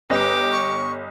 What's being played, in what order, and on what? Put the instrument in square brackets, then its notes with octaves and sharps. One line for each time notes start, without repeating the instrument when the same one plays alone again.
[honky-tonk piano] G1 D#5 [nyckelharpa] G4 D6 [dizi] B4
[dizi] C#6